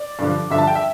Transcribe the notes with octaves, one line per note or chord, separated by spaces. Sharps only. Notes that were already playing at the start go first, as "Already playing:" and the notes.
Already playing: D5
G2 D3 F3
G2 D3 F3 E5
A5
G5
E5